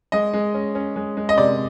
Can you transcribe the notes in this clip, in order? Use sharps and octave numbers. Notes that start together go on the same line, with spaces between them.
G#3 D#5
G#3
C#4
C#4
G#3
G#3
D#5
C3 D5